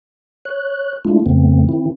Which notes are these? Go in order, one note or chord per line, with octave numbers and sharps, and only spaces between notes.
C#5 F#6
G#3 A3 D4 E4 F4
F2 C#3 A3 B3 C4
D#3 C4 E4